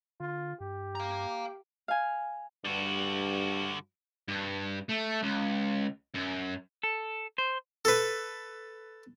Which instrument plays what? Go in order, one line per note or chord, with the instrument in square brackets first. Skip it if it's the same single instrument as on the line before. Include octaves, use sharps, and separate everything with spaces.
[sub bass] D3 [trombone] F4
[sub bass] G2 [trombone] G4
[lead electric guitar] F5 A#5
[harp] F5 G#5
[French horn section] G2 [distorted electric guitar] D3 F#4
[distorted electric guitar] G2
A3
C#2
F#2
[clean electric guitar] A4
C5
[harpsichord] A4 B4